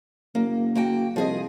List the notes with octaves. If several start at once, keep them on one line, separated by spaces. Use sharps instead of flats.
F#1 A#3
A#3 F#4 G5
C2 F3 G#4 D#5